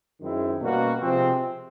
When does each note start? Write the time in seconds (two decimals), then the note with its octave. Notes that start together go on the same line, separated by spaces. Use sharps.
0.20 F#2 D#3 G#3 C4 E4
0.61 B2 G3 A#3 C#4 F#4
1.00 C3 F3 G#3 C4